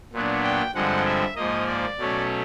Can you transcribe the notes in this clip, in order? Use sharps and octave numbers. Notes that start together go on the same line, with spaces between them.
A#2 F#3 B3 D4
G5
G2 D3 F3 G#3 C4 F#5
E5
G#2 F3 A#3 D#5
D5
B2 F#3 A3 C#4